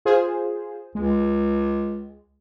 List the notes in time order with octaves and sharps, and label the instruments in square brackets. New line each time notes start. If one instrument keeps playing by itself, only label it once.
[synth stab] F4 G#4 C5
[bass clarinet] C#2 [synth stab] G#3